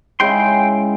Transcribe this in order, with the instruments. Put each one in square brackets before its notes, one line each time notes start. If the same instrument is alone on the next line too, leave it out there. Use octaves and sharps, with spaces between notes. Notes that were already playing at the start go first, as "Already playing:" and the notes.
[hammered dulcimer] C#3 G#3 E4 [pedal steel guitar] G5 C6